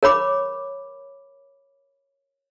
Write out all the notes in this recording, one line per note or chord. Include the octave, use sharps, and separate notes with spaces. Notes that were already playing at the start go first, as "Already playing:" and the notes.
A#4 C#5 B5 D6